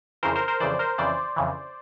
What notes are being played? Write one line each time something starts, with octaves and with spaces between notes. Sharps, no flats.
F2 C#3 E3 A#4 C5
A#4 C5
A#4 C5
F2 C#3 E3 C5 D5
A#4 C5
F2 C#3 E3 C5 D5
F2 C#3 E3